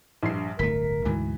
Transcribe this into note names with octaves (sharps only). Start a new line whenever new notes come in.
A#1 G2 C7
D1 G1 A3 A#4 B6
D2 G#2 B2 E3